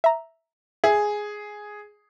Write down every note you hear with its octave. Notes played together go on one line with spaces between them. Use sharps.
E5 A#5
G#4 E5